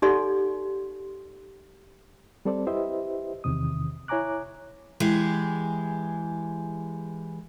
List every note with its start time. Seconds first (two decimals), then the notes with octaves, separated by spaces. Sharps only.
0.02 D#4 G4 A4 D5 F#5 C6
2.45 G3 C4 A4 C5 D5
2.67 E4 G4 B4 C5 D#5 E5
3.44 E2 C3 D#3 D#6
4.08 E4 C#5 G#5 A#5 D6 F#6
5.00 E3 G#3 G4 G#4